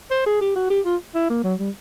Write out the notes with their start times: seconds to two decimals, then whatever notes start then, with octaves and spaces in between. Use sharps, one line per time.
0.11 C5
0.26 G#4
0.41 G4
0.56 F#4
0.70 G4
0.85 F4
1.15 E4
1.30 A#3
1.44 F#3
1.59 G3